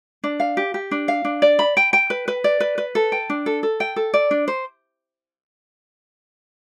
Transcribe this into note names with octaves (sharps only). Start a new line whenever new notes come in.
D4
F5
G4
G4
D4
F5
D4
D5
B5
G5
G5
B4
B4
D5
B4
B4
A4
G5
D4
A4
A4
G5
A4
D5
D4
C5